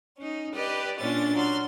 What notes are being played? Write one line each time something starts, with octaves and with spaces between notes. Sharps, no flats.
C#4 D#4
G4 B4 D5 D#5
A#2 C#4 D4 F4 A6
F#3 C6 F6